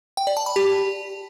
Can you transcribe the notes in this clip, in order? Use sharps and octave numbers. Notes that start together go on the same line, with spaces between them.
G5
D5
A5
B5
G4